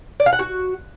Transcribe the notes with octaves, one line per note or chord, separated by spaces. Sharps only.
D5
F5
F#5
F#4